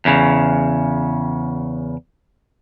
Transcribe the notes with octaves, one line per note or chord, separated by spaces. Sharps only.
E2 C#3